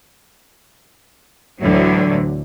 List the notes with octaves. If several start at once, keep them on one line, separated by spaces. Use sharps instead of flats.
D2 A2 D3 E3 F#3